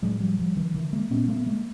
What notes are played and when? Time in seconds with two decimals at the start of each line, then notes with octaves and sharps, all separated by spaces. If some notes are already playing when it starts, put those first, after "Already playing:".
0.02 A2 F#3 G#3
0.20 F3 G3
0.39 F3 G3
0.57 D#3 F3
0.74 D3 E3
0.93 G#3 A#3
1.10 A#2 B3 C#4
1.28 A3 B3
1.46 G#3 A#3